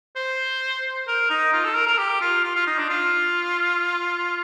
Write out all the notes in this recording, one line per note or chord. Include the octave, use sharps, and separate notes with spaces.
C5
A#4
D#4
F4
A4
A#4
A#4
G4
F4
F4
F4
D#4
D4
F4